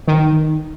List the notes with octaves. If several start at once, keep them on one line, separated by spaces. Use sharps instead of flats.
D#3